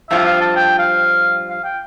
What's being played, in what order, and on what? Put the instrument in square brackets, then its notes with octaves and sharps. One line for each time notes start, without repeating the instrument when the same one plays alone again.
[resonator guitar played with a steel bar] G2 F3 C4 F4 [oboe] E5
[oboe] F5
A5
G5
F5
F5
G5